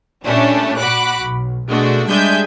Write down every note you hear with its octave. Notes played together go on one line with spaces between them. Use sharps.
A#2 G3 A3 C#4 D4
A#2 F#4 B5 D6 F#6
B1
B2 G#3 A3 D4 F#4
G3 G#3 D4 E5 G#5 G6